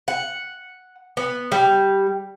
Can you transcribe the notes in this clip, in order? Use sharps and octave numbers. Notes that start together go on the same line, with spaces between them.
F#5
B3
G3